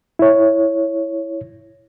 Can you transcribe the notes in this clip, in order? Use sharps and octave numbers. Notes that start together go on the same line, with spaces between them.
E4 C#5